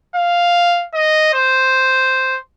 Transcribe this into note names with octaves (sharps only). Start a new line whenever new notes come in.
F5
D#5
C5